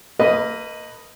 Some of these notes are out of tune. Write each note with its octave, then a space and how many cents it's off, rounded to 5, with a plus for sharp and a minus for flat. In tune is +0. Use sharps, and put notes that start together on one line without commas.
A#3 -35 B4 +0 D#5 +0